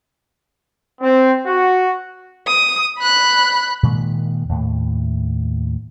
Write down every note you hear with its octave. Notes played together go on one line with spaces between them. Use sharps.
C4
F#4
D#6
B5 F#6
A#2 D#3 G#3 A#3
D#2 A2